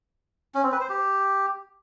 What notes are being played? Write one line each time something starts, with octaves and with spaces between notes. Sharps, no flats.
C#4
C4
B4
C5
G4